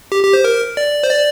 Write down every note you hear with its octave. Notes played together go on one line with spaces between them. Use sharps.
G4
G4
C5
A#4
D5
C5
D5